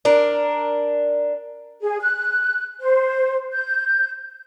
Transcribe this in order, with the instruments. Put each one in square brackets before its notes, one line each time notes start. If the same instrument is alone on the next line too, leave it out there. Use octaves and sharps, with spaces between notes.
[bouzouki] D4 A#4
[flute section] G#4
F#6
C5
G6